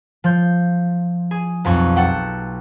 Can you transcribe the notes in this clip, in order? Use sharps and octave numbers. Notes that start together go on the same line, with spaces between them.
F3 G6
G#4
B1 F2 C#6
A4 F#5 G5